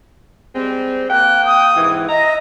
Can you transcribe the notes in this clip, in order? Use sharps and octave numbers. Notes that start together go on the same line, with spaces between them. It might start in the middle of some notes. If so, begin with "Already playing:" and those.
G3 G#3 C4
A#3 G5 F#6
D#6
G#2 C3 E3
D#5 E5 A#5